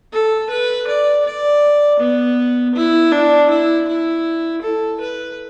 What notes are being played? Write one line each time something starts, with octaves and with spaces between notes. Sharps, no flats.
A4
B4
D5
D5
B3
E4
D4
E4
E4
A4
B4